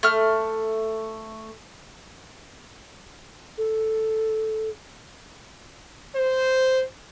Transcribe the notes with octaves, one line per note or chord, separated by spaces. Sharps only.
A3 F6
A4
C5